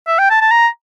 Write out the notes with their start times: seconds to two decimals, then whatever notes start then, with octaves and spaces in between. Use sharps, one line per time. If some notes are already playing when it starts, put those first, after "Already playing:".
0.07 E5
0.18 G5
0.30 A5
0.41 A5
0.51 A#5